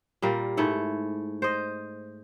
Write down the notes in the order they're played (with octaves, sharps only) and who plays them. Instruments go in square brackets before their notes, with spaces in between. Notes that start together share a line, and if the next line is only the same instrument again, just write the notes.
[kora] A#2 G3 A#3
G#2 A3 E4
C5 D#5